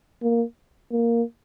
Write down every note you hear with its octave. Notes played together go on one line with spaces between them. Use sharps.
A#3
A#3